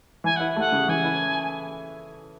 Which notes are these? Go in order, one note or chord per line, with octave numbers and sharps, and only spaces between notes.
E3 G#5
E4 F#5
A3 F#5
C#3
E3 G#5
E4